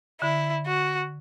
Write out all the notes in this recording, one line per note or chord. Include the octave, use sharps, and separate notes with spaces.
D3 E4
F#4